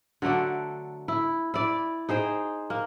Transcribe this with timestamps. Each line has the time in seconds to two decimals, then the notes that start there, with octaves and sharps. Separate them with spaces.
0.22 D3 F#3 A3 D5
1.08 E4
1.54 E4 D5
2.09 D#4 G#4 C5 G5
2.70 A#3